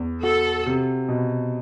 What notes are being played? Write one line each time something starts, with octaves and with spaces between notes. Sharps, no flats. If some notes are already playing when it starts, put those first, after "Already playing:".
Already playing: E2
F#4 A4
C3
B2